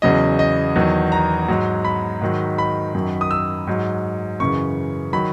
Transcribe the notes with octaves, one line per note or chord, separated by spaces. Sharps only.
E2 C#3 F#3 D#5
D#5
E2 D#3 F#3
A#5
G#2 F#3
B5
G#2 D#3 F#3
B5
F#2 D#3 F#3
D#6
E6
G#2 F#3
F#2 C#3 E3 C#6
D#3 F#3 B5